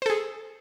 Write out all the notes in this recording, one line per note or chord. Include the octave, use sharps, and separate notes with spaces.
G#4 A4 C5